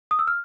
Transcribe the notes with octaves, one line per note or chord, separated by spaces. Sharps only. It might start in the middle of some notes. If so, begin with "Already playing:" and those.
D#6
E6
F6